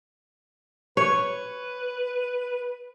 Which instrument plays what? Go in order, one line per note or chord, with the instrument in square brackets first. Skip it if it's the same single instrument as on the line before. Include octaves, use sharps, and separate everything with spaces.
[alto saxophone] B4 [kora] C#5